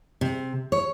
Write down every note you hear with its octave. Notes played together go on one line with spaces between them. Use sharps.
C3
C#5